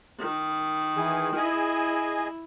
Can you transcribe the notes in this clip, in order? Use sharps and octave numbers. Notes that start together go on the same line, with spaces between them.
D#3
E3 G#4
E4 G#4 D#5 G#5